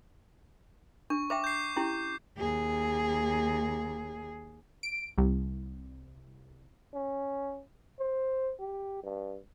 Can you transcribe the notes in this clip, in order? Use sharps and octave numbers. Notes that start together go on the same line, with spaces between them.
D4 C#6
C5 E5 G5 D6
G6 C7
C#4 E4 G4
D#2 G#4
D7
C2
C#4
C5
G4
G2